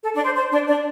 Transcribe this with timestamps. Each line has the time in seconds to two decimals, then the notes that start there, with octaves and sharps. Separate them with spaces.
0.03 A4
0.14 D4 D5
0.24 C5
0.36 C5
0.51 D4 D5
0.67 D4 D5